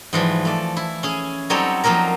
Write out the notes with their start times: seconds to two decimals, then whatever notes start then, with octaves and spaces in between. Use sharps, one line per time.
0.13 G#2 E3 F3 G3
0.45 A3 D5
0.77 E4
1.03 C#4 G#4
1.50 F#3 G3 C4 D#4 A4 C#5
1.84 F3 F#3 A#3 D#4 A#4